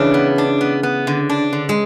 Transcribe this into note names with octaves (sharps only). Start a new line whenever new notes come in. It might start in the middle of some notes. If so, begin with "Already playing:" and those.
Already playing: C#3 E3 D4
B3
D4
B3
B3
D3
D4
D3
G#3